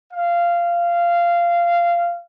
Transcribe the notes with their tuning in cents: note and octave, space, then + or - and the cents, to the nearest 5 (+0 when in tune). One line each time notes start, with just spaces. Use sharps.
F5 -15